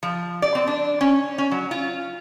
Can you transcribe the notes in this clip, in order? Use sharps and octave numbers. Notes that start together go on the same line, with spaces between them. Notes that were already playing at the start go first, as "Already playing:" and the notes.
F3
D5
C4
D4
C#4
C#4
F#3
F4